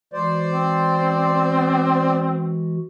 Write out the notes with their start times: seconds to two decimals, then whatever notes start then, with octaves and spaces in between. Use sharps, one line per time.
0.13 E3 G#3 F#4 C5 D5
0.51 C4